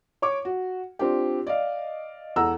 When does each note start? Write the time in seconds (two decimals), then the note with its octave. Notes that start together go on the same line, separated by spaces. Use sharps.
0.22 C#5 C#6 D6
0.45 F#4
0.99 C4 D4 F4 G4
1.47 D5 D#5 F5
2.36 E2 A4 F#5 A#5 E6